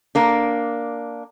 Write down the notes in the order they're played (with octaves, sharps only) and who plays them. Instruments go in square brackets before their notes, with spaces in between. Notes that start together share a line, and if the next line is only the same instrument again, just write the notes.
[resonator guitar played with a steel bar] A#3 D4